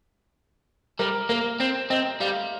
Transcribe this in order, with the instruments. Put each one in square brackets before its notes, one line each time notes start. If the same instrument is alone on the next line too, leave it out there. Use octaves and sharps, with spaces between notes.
[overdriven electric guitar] G3 [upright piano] A#4
[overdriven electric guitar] A#3 [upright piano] A#4
[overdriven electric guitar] C4 [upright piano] C5
[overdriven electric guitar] C4 [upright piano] D#5
[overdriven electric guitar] G3 [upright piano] F5